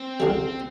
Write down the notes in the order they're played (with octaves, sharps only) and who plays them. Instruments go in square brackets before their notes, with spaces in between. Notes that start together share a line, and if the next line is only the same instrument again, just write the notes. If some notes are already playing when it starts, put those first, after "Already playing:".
Already playing: [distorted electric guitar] C4
[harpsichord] C#2 C#3 G3